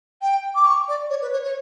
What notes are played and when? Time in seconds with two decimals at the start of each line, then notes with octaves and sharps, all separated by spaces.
0.22 G5
0.55 D6
0.66 C#6
0.88 D5
1.10 C#5
1.22 B4
1.33 C#5
1.44 C#5